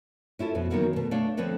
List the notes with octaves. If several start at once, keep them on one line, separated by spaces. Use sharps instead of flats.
C#4 E4 F4 A4
F2 B2
D#3 E3 F#3 A#3 B3 C#4
B2 A3
A3 D4 C#5 E5 F5
D3 F3 C4 B4 C#5